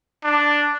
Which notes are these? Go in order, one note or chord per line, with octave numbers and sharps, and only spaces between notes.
D4